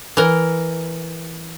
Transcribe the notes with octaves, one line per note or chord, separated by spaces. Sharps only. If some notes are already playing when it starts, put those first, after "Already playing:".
E3 A#4